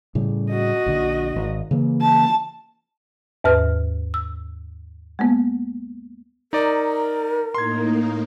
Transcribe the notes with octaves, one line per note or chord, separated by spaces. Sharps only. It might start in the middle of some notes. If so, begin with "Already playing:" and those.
A2 C#3 G3
F#4 D#5
A#1 D3
G#1
C#3 E3 A#3
A5
D#2 G#2 B4 F6
E6
G#3 A#3 B3
D#4 A#4 D5
A2 A#3 D#4 C6 G#6